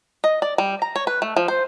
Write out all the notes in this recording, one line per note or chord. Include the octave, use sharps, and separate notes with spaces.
D#5
D5
G3
A#5
C#5
B4
A3
F3
C5